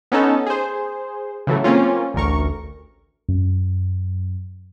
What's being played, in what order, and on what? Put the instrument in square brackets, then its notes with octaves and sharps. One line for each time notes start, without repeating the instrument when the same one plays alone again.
[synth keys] B3 C#4 D#4 A4
G#4 C5
C#3 E3 F#3 A3
A#3 C4 C#4 F4
A1 D2 A#4 C#6
F#2